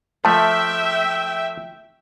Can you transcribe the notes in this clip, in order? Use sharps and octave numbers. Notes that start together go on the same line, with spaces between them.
F3 A3 E5 G5 A5